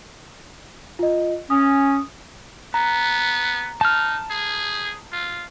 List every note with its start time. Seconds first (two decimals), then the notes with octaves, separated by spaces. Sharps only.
0.99 F4 D#5
1.50 C#4 D#6
2.74 B3 A#5
3.81 D#4 A5 F6
4.31 G#4
5.12 F4